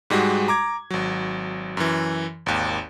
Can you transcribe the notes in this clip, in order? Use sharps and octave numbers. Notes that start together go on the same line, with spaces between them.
G#2 G3 G#3 F#4
A#5 D6 G#6
G#1 F#3
F#2 E3
G#1 D#2